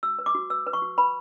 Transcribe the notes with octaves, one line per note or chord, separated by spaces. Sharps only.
F#4 E6
B4
D6
F#4
B4 E6
B4
C#6
F#4
B4 B5